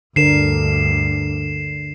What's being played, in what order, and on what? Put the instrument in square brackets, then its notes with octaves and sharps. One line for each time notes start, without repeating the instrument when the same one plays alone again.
[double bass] D2 G2 [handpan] D3 D4 A#4 [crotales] C7 E7